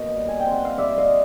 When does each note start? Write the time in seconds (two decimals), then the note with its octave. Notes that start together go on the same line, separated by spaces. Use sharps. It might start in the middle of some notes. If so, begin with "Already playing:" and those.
Already playing: B2 A#3 C#5 D#5
0.16 G3
0.29 G#5
0.40 G5
0.46 C4
0.53 F#5
0.65 F5
0.77 G3 D5 E5
0.98 D#5 F5